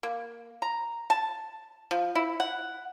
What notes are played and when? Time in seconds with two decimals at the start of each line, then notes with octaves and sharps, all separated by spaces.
0.03 A#3
0.62 A#5
1.10 A5
1.91 F3
2.15 E4
2.40 F#5